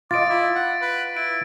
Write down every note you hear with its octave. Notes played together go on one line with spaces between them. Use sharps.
F4 D#5 D6 A6 D7
E4
F#5
B4
E4 D7